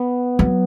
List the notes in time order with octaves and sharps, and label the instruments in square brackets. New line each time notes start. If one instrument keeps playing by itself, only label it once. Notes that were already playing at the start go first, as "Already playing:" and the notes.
Already playing: [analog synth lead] B3
[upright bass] F#3